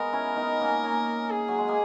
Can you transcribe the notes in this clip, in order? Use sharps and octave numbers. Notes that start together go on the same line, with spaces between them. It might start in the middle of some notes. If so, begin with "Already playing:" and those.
Already playing: G#3 B3 A#4
C#4 E4
B3 D#4
A#3 C#4
A#3 C#4
G#4
F#3
G#3
A#3